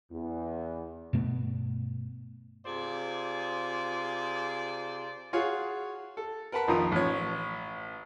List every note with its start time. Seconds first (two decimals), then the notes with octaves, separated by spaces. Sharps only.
0.12 E2
1.13 G2 B2 A3 B3
2.65 C3 F4 G#4 C5 D5
5.33 F4 F#4 G#4 C#5 F5
6.17 A4
6.52 A#4 B4 F#5 A5 B5
6.68 A#1 F2 A#2 D#3 A#5 D#6
6.92 A1 F3 C#5